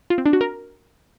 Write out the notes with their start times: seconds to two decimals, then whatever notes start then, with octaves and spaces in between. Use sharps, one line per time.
0.10 F4
0.18 C4
0.26 D4
0.33 F#4
0.41 A#4